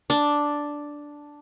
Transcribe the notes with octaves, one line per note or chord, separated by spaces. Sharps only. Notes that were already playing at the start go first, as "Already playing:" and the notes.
D4